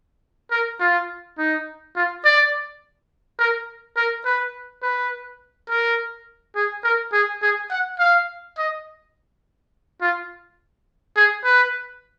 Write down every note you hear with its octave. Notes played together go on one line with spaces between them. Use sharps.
A#4
F4
D#4
F4
D5
A#4
A#4
B4
B4
A#4
G#4
A#4
G#4
G#4
F#5
F5
D#5
F4
G#4
B4